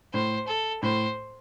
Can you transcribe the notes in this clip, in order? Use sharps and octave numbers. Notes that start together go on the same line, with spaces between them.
A2 C5
A4
A2 C5